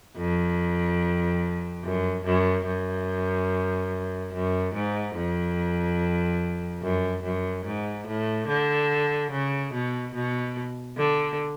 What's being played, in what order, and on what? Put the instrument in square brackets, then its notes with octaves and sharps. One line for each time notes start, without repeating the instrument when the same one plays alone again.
[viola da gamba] F2
F#2
F#2
F#2
F#2
G#2
F2
F#2
F#2
G#2
A2
D3
C#3
B2
B2
D3